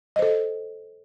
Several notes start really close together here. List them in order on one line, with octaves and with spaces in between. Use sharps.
D#5 C5 A4